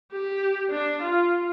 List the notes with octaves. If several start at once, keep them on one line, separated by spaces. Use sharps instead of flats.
G4
D4
F4